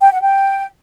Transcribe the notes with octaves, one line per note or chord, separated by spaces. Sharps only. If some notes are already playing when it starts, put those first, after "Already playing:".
G5
F#5
G5